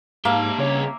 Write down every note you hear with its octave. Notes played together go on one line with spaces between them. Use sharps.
G#2 A#3 G4 E5 A5
C2 C#3 C#5